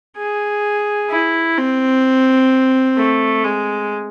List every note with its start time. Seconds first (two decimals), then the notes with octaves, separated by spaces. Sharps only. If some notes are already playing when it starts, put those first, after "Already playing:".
0.17 G#4
1.10 E4
1.57 C4
2.97 A3
3.45 G#3